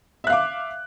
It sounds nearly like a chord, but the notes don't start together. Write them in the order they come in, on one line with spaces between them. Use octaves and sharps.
E5 F#6 F5 D6